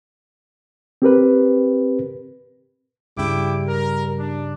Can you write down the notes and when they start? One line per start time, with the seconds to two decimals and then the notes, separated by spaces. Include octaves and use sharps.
1.02 C4 G4 A#4 B4
3.17 C#2 G2 C#3 G3 E4 G5 D6
3.67 A#4
4.19 D4